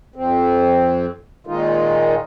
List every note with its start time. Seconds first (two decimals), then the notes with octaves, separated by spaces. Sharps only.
0.16 F2 C4
1.47 A#2 D#3 G#3 D#4 F4